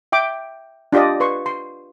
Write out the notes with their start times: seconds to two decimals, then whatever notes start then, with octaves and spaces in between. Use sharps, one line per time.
0.12 E5 G5 D6
0.92 D4 F4 G4 D5 D#5
1.20 B4 C6 C#6
1.46 C6